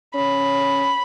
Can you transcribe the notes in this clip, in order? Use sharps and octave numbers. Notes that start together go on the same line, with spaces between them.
C#4 B5